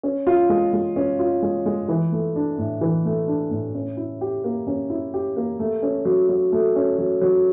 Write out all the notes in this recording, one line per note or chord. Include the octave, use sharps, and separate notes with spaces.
C#4
F4
G#3
G#3
C#4
F4
G#3
G#3
E3
A3
D4
A2
E3
A3
D4
A2
C#4
E4
G4
A#3
C#4
E4
G4
A#3
A3
C#4
F#3
F#3
A3
C#4
F#3
F#3